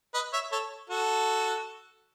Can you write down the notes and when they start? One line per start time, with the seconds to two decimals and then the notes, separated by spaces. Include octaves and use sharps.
0.14 B4 D#5
0.33 C#5 E5
0.52 A4 C#5
0.89 F#4 A4